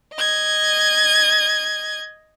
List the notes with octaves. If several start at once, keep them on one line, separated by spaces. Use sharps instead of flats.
D#5 G#6